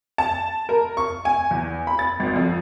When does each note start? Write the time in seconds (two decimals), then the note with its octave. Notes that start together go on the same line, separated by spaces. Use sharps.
0.18 A5
0.69 A#4
0.97 C#6
1.25 G#5
1.51 E2
1.87 B5
1.99 A6
2.20 G#1
2.36 F2